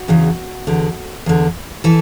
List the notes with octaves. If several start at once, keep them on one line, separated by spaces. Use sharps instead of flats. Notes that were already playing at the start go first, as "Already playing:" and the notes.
Already playing: F#4
E2 C#3 E3
E2 D3
E2 D3
E3 A4